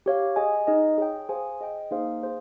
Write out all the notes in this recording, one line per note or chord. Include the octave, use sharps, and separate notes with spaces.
G4 C#5 F5
G#4 D#5 G#5
D#4 G#4 D#5
G#4 C#5 G5
G#4 C5 F5 G#5
G#4 D#5 G5
A#3 D#4 G#4 C5 F5
G#4 C5 F5